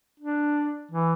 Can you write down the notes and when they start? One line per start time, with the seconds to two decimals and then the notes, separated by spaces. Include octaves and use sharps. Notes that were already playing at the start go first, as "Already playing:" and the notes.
0.20 D4
0.91 E3